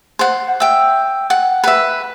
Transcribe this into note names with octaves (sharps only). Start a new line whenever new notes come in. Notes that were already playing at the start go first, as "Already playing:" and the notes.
C5 F#5
E5 G5
F#5
B4 E5